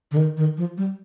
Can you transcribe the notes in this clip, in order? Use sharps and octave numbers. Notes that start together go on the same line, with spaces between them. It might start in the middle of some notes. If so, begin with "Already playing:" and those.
D3
D#3
D#3
F3
G3